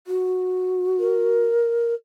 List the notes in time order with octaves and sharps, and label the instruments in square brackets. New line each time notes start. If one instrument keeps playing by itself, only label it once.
[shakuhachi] F#4
[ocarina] A#4